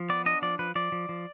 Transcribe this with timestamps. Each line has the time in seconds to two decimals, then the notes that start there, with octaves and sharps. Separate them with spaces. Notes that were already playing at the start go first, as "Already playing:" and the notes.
Already playing: F3
0.09 B3 D5
0.26 D4 D#5
0.42 F3 D5
0.59 F3 B4
0.75 F3 D5
0.92 F3
1.09 F3